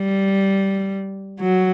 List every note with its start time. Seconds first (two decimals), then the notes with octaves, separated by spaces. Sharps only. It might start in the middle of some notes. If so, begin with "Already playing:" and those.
Already playing: G3
1.40 F#3